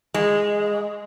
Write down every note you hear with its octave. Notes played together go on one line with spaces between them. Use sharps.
G#3